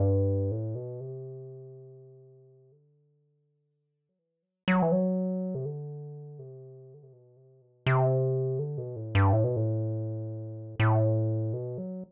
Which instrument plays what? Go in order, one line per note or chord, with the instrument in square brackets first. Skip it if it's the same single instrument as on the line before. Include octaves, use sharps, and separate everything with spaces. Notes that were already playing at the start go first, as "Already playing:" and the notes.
Already playing: [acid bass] G2
A2
B2
C3
D3
F#3
E3
F#3
F#3
E3
F#3
C3
D3
C3
D3
C3
B2
C3
B2
C3
D3
B2
A2
G2
A2
B2
A2
A2
B2
F#3